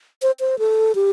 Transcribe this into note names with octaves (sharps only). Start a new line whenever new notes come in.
C5
C5
A4
G4